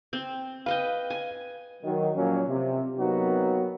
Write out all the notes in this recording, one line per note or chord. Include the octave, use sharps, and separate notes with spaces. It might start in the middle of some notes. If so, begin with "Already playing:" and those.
C4
B4 D#5 F5 G5
G#5
D#3 F#3
A#2 F3 F#3 A#3 C#4
C3
C3 F#3 A#3 B3 D#4 F#4